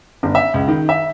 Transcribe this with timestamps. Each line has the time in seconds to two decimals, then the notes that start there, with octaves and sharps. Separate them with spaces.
0.23 G1
0.35 E5
0.54 C#2
0.68 D#3
0.89 E5